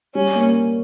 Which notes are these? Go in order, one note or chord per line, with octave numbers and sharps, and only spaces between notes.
G3 C#4
A#3